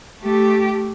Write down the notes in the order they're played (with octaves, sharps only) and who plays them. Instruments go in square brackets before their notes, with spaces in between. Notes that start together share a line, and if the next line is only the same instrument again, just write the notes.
[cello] A3 G4